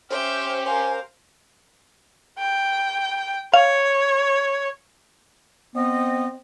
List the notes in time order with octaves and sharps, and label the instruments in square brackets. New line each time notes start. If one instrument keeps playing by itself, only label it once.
[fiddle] C#4 G4 [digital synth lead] C5 [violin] E5 G5 [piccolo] F6
[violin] A#4 F5 [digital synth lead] C5 [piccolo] G#5
[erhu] G5
[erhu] C#5 [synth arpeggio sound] F5
[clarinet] B3 [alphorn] C4 [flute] D#5